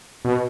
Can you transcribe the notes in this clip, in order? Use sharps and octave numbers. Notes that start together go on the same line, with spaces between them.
B2